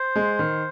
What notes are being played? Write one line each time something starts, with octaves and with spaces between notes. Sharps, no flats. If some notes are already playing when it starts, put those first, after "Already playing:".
Already playing: C5
G#3
D#3